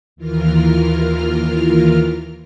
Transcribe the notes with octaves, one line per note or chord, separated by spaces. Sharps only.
D#2 E3 F4 A#4 F6